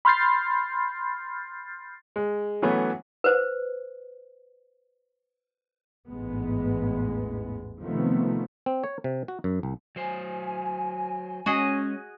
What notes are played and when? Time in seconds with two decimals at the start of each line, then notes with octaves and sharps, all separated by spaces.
0.05 B5 C6 F6 G6 A6 C7
2.16 G#3
2.62 E3 F#3 A3 B3 C#4
3.24 B4 C5
6.09 A1 E2 G#2 G#3 B3
7.82 C3 D#3 F3 A3 B3 C4
8.66 C4
8.84 C#5
9.04 C3
9.28 F#4
9.44 F#2
9.63 C2
9.96 F#3 C5 G#5
11.46 G#3 C#4 F#4 G#4 D#5